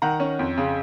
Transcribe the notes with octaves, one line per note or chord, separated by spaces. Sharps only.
D#3 F#5 A#5
C#4
F2
C#3